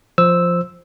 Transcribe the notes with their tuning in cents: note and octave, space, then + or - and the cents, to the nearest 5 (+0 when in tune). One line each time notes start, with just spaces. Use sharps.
F3 +0 C5 +0 E6 -5